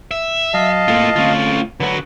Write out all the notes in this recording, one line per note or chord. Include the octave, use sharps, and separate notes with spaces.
E5
F#3 D#5 F5 A5
A2 A#3 F4 A4
D2 A3 C4 C#4 F4
D3 F#3 F#4 B4